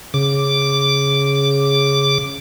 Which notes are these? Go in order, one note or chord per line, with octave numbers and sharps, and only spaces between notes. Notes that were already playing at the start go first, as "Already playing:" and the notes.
C#3 D6